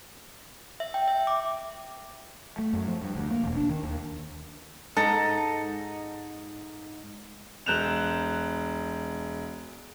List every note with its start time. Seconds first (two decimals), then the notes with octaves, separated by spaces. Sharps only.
0.80 E5
0.94 G5
1.08 E5
1.27 D6
2.58 A3
2.73 F#2
2.88 F3
3.02 G2
3.15 D2
3.31 A#3
3.43 E1
3.57 D4
3.69 D#3
3.83 D#2
4.97 G#2 D#4 A4 A#5
7.66 E1 F#6 G6 E7 F7